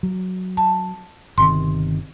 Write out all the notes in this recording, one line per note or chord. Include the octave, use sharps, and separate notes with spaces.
F#3
A5
G1 C3 D#3 C6